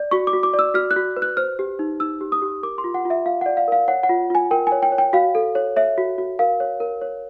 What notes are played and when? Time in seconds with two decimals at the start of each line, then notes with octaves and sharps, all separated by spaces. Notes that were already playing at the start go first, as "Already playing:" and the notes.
Already playing: D5
0.11 F#4 C#6
0.27 D6
0.33 F#4
0.43 D6
0.53 D5
0.59 E6
0.74 F#4 F6
0.91 F#6
0.96 F#4
1.16 B4
1.22 F#6
1.37 C5 F6
1.59 G4
1.79 D#4
2.00 D#4 E6
2.21 G4
2.32 D#6
2.42 G4
2.63 A#4 D6
2.78 C6
2.84 F4
2.94 F#5
3.05 F4
3.10 E5
3.26 F4 F5
3.41 D5 F#5
3.57 F5
3.68 A#4 F5
3.88 C#5 F#5
4.03 F#5
4.09 F4
4.30 F4 G#5
4.51 A#4 G5
4.67 C#5 G#5
4.82 G5
4.92 C#5
4.98 G5
5.13 F#4 F5
5.35 A4
5.55 C#5
5.76 C#5 E5
5.98 F#4
6.18 F#4
6.39 A#4 F5
6.60 C#5
6.80 A#4
7.02 C#5